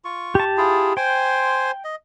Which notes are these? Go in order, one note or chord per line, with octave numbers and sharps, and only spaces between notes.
F4 C#6
G4 A5
E4 F4 G#4
C5 G5 G#5 C6
D#5